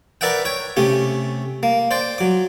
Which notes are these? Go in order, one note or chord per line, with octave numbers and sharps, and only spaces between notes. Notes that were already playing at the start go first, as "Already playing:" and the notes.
A#4 B4 D5 E5 F#5 G5
C#5 G5
C3 A3 C#4 G4
A#3
C5 D5 G5
F#3 D6